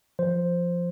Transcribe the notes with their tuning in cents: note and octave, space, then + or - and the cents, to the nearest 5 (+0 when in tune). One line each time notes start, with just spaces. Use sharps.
F3 +0 C5 +0